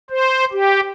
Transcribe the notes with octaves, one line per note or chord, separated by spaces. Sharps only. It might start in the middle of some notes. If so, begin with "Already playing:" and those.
C5
G4